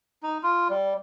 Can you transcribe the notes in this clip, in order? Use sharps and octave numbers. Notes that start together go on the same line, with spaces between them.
D#4
F4
G3